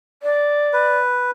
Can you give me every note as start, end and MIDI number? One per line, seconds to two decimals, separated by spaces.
0.23 0.98 74
0.73 1.31 71